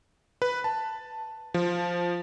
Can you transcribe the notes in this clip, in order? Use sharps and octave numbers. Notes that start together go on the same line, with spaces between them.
B4
A5
F3